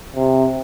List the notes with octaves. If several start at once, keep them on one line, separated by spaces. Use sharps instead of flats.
C3